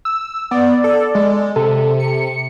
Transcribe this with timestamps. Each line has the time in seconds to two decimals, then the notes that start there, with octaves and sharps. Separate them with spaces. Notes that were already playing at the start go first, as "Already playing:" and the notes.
0.05 E6
0.51 B3 D5
0.84 A4
1.15 G#3
1.56 C3 A4
2.00 C#7